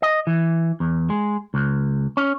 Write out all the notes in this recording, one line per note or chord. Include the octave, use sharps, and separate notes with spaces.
D#5
E3
E2
G#3
C#2
C#4